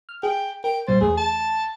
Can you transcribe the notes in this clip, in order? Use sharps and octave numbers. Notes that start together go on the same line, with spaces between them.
F6
G#4 G5
A#4 G5
A#2 G3 C5 A6
E2 A3 G#4
A5